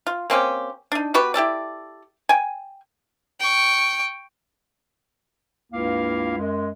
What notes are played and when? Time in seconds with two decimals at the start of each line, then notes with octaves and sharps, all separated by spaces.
0.07 F4
0.30 A#3 C4 C#4 G4
0.92 D4 D#4
1.14 B3 F#4 G4 B4
1.34 E4 G4 A4 D5
2.29 G5 G#5
3.39 G5 C#6
5.72 C#2 G2 A#3 E4 F5
6.38 F#2 G#3